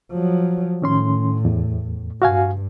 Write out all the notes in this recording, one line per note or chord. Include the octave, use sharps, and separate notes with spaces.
F3 F#3
A2 D#3 C#4 C6
E2
G2 F#4 F5 G#5